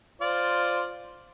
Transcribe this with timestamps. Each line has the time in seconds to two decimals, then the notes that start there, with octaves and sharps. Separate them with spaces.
0.21 F4 C5 D5